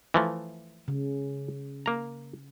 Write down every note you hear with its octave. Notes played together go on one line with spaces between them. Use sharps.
E3 F3 A3
C#3
A#3 A#5